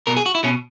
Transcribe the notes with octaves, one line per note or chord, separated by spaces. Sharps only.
B2 A#4
G#4
F#4
E4
B2 C#4